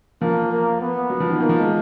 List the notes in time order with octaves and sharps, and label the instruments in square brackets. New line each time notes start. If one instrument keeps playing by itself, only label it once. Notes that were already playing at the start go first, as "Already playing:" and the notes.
[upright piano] F3 [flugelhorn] A#3
[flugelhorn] A#3
B3
[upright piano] F#3
F3
D#3
[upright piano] D#3 [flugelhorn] A#3
[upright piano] F3
G#3